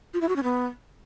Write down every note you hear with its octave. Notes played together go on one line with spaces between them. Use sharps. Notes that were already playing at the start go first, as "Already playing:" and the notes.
F4
E4
F#4
C#4
B3